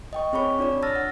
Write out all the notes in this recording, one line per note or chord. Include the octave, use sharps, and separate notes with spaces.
D#5 G5 C#6
C4 G#4 C#5 B5 C#6
D4 F4 C#5 D5
A5 E6 F6 A6 A#6
F#5